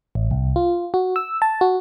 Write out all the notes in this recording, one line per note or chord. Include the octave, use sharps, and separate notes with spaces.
A1
C2
F4
F#4
E6
A5
F#4